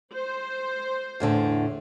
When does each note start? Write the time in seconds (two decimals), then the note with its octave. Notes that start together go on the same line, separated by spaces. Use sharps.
0.14 C5
1.20 E2 A2 D3